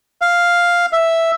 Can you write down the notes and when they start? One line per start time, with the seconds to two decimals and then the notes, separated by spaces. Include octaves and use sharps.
0.22 F5
0.93 E5